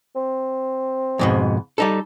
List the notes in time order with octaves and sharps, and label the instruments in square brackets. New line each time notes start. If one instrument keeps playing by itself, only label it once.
[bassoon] C4
[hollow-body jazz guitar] F2 G#2 B2
G3 D#4 A4